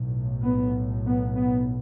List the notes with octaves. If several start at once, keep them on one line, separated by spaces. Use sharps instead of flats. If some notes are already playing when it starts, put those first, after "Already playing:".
Already playing: B1 A2
B3
B3
B3